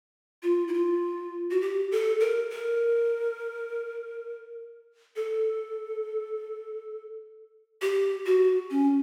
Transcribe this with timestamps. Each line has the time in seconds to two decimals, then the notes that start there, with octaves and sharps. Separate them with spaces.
0.43 F4
0.68 E4
0.74 F4
1.51 F#4
1.61 G4
1.92 A4
2.20 A#4
2.50 A#4
5.16 A4
7.82 G4
8.26 F#4
8.70 C#4